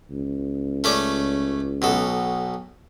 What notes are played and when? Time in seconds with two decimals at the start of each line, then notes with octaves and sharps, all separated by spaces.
0.10 C#2
0.84 A3 C#4 D5
1.82 B1 B2 A4